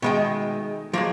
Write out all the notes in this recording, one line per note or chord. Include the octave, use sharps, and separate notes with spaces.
B2 D#3 G#3 A3 D#5 G5
F3 F#3 G#3 A#3